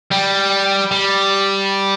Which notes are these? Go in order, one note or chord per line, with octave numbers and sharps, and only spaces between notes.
G3
G3